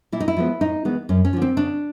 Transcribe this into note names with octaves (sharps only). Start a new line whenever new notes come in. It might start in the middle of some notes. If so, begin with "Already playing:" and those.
A#2 E4
D#4
E4
F3 G#3 B3
A2 D#4
E3 G#3 B3
F#2 C#4
C#4
D3 F3
C4
C#3 D4